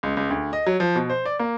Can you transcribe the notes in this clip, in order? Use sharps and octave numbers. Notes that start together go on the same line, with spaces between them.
C#2
C#2
D2
D#5
F#3
F3
B2
C5
D5
A#3